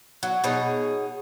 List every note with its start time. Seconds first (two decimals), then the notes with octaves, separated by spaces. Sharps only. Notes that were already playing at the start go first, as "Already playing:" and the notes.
0.23 F#3
0.44 B2 D#4 G#4 C#5